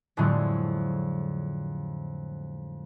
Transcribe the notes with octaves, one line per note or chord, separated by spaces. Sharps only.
F2 A2 D3 F#3 G#3 A3